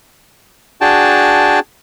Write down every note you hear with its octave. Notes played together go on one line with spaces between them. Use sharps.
D4 F#4 G#4 G5 A5